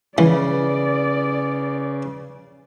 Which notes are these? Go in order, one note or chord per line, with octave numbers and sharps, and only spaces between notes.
C#3 E3 B4 D5